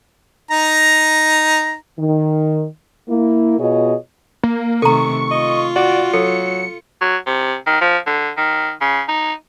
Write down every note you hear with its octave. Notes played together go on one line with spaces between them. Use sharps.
D#4 A#5
D#3
A#3 E4
B2 F4 G#4 C#5 D#5
A#3
C3 D#3 A3 A4 A#5 C#6
F4 D#5
F#4 D5
F#3 A4 C#7
F#3
C3
D#3
F3
D3
D#3
C#3
D#4